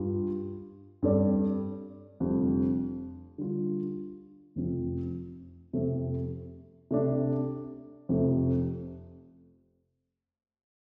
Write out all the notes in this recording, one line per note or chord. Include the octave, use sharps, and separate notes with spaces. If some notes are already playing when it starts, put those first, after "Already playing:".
Already playing: G2 G3 F4
G2 G3 C4 A4 D5
F1 F2 D3 G3
D3 G3 F4
F1 F2 C3 F3 C4
F2 C3 A3 C4
C3 A3 D4
F1 F2 C3 A3